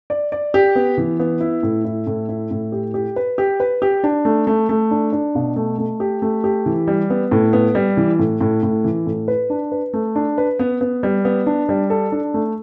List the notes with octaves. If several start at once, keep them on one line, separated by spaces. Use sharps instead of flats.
D5
D5
G4
B3
E3
B3
E4
A2
E4
A2
E4
A2
G4
G4
B4
G4
B4
G4
D4
A3
A3
A3
D4
D4
B2
A3
A3
G4
A3
G4
E3
G3
B3
A2
B3
G3
E3
A2
A2
A2
E3
A2
B4
D4
B4
A3
D4
B4
B3
B3
G3
B3
D4
G3
A4
D4
A3